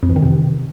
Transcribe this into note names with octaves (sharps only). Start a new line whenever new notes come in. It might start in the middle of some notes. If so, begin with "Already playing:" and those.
F2
E3
D#3
C3